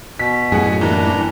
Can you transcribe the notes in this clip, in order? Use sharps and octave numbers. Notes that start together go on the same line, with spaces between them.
B2 B6
F#2 A2 G#4 F#5
E3 G3 A#3 D4 A#5